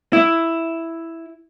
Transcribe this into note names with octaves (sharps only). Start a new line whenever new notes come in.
E4